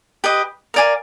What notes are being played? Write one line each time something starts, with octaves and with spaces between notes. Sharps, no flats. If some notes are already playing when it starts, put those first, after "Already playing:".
G4 B4 D#5
A#4 D5 F5 G#5